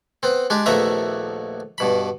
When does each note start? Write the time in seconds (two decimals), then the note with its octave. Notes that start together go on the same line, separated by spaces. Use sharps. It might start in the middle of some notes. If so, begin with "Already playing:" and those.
0.23 B3 C4
0.50 G#3 D4 G4
0.66 A#1 D#2 A3 B3 E5 A#5
1.78 G2 B2 B5